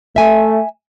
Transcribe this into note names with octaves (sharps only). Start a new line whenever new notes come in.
A3 E5 G#5